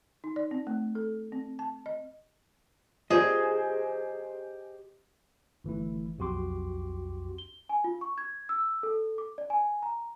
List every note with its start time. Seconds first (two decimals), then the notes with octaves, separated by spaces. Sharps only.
0.24 D#4
0.36 D5
0.51 C4
0.67 A3
0.95 A4
1.32 C4
1.59 A5
1.86 D#5
3.10 F4 G4 G#4 C5 D5 D#5
5.64 G1 E3 A3 E4
6.18 B1 F2 F#4 G4 C6 D6
7.38 G7
7.69 G#5
7.84 F4
8.01 C#6
8.18 G#6
8.49 E6
8.83 A4
9.18 D6
9.38 D5
9.50 G#5
9.83 A#5